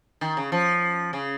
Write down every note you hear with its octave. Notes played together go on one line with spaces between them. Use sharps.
D#3
C#3
F3
C#3